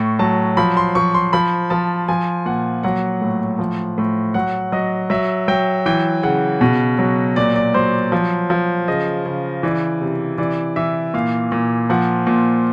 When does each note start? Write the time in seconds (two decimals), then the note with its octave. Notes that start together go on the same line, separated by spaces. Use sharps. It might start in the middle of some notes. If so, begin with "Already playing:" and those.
Already playing: A2 C#6
0.19 F#3 A5
0.57 F3 B5
0.77 C6
0.95 F3 C#6
1.14 C6
1.33 F3 B5
1.70 F3 A5
2.08 F3 G#5
2.46 A#2 F#5
2.83 F#3 F#5
3.22 A2
3.59 F3
3.98 A2
4.34 F#3 F#5
4.72 F#3 D#5
5.10 F#3 E5
5.48 F#3 G5
5.86 E3 G5
6.23 C#3 F#5
6.61 B2
6.99 F#3
7.36 A#2 D5
7.56 D5
7.74 F#3 C5
8.12 F3
8.50 F3
8.88 C#3 D#5
9.26 C#3
9.63 E3 D5
10.01 C3
10.38 E3 D5
10.76 E3 E5
11.14 A#2 F5
11.52 A#2
11.90 F3 F#5
12.27 A#2